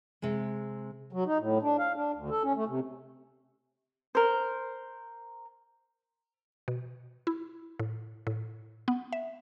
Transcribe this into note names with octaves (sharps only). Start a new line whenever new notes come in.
C3 G#3
F#3
D#4
A2
D4
F5
D4
D2
A4
C#4
A3
C3
A#4 C5
B2
E4
A2
A2
B3
E5